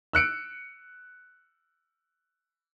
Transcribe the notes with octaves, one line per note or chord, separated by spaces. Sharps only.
E6 F#6 C#7 D7